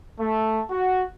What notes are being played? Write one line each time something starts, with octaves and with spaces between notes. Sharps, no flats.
A3
F#4